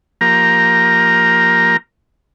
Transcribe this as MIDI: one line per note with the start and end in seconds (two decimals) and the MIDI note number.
0.21 1.77 53
0.21 1.77 58
0.21 1.77 67
0.21 1.77 70
0.21 1.77 82